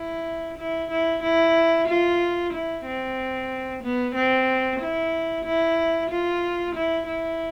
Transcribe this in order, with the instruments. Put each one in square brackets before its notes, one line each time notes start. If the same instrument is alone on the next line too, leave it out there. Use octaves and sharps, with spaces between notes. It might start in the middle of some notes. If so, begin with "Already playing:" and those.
Already playing: [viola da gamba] E4
E4
E4
E4
F4
E4
C4
B3
C4
E4
E4
F4
E4
E4